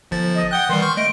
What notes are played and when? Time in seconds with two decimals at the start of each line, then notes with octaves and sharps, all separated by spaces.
0.11 G1 F3 A6
0.35 D#5
0.51 F#5 G5 D#6 F#6
0.69 D#3 E3 G3 C6
0.82 C#6 F6 G6
0.97 A3 D#5 D7